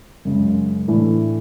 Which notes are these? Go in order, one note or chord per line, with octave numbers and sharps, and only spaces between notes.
F#2 C#3 G#3
A2 E3 A3 D4